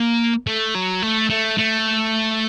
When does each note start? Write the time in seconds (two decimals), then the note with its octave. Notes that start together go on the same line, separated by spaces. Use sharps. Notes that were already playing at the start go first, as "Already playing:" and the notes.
Already playing: A#3
0.47 A3
0.75 F#3
1.02 A3
1.30 A3
1.58 A3